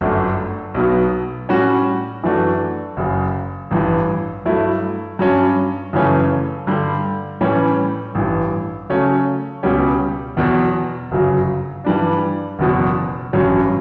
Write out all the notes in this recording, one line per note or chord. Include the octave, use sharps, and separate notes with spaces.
G1 F#2 D3 A3 D4
B1 B2 F#3 B3
A2 G3 C#4 F#4
F#2 E3 A3 D4 F#4
F#1 F#2 C#3
A1 G2 E3
G2 F#3 A3 E4 A4
G2 F#3 C#4
F#2 C#3 E3 A3 C#4
G2 D3 G3
A2 E3 G3 C#4
A1 G2 E3
C#3 F#3 A3 C#4
C#2 B2 G3 C#4 G4
E2 B2 F#3
G1 F#2 C#3 F#3
G2 E3 G3 D4
F#1 E2 B2 F#3
A1 G2 F#3 C#4